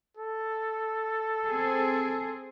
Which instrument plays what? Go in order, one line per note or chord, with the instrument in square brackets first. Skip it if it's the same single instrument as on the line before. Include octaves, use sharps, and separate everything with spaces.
[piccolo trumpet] A4
[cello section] C4 G#4